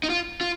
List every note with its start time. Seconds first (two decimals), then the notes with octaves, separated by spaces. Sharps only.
0.04 D#4
0.10 F4
0.41 F4